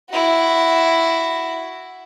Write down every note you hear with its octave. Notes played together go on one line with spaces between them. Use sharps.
E4 F#4